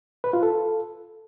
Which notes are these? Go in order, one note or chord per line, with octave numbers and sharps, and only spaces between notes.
B4
F4
A4